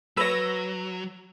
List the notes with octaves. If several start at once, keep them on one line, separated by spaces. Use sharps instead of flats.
F#3 B4 C#5 E6 A#6